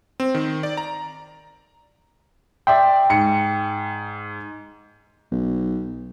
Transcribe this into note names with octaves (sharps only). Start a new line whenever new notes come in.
C4
D#3
D5
A#5
D5 E5 G5 C6
G#2 C#7
B1